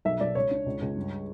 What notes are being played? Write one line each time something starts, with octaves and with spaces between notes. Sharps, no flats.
B1 E5
B1 D5
C#2 C#5
D4
C#2
C#2
G2